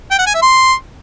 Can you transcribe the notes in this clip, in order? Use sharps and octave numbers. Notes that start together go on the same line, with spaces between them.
G5
F#5
G#5
E5
C6